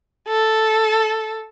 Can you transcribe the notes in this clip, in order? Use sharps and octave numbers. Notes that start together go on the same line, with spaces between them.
A4